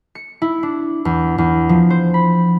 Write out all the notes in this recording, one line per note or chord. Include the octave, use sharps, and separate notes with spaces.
C#7
E4
D4
E2
E2
F3
C5
B5